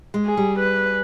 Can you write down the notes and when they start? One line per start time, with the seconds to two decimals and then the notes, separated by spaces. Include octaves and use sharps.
0.14 G#3
0.26 G#4
0.37 G3
0.60 B4